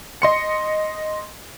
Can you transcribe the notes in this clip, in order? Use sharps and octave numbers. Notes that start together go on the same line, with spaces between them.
D#5 C6 C#7